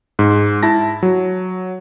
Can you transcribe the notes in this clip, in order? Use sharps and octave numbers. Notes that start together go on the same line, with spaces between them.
G#2
E4 A5 A#6
F#3